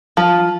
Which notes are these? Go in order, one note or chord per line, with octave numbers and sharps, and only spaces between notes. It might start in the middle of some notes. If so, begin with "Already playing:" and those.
F3